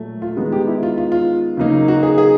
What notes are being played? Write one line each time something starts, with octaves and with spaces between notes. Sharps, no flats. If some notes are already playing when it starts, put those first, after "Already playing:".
Already playing: A#2 F#3 A3
F4
D#3 G#3 B3 D#4 F#4
G4
E4
F4
F4
F4
C#3 F#3 A#3 D#4
F#4
G#4
G#4